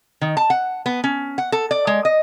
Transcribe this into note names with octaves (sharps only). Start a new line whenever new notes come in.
D#3
A5
F#5
B3
C#4
F#5
A4
D5
G#3
D#5